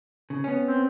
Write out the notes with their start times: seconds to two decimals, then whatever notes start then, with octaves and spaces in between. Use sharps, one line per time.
0.30 C#3
0.44 B3 C#4
0.67 C4